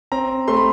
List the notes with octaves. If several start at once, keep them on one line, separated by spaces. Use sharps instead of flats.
C4 A#5
A3 C6
B5